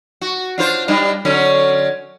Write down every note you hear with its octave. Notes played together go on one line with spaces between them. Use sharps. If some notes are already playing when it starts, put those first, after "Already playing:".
F#4
D4 F4 C5
G3 D4 D#4
D3 F#3 C#4